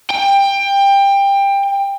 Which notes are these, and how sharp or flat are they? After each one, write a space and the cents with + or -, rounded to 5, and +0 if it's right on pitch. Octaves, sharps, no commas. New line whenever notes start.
G5 +20